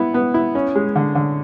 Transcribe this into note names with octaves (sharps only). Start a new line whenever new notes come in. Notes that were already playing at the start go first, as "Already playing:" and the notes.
Already playing: B3 E4
B3
E4
C#4
G#3
D3
D3